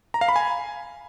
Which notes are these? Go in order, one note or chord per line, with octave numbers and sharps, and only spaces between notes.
A#5
F5
B5
G#5